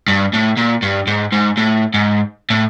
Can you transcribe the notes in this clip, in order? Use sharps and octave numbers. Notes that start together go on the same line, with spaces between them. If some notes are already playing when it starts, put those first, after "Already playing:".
G2
A2
A#2
G2
G#2
G#2
A2
G#2
A2